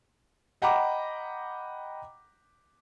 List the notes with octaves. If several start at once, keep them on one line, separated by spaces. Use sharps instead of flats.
D#5 F#5 G5 A#5 B5 D6